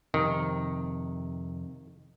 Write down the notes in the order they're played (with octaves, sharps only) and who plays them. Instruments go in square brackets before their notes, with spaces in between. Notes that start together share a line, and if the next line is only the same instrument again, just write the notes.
[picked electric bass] F2 C3 [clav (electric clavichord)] D#3